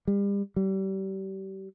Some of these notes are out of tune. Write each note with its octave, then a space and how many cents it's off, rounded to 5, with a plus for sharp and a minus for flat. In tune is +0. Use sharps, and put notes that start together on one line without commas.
G3 +35
G3 -30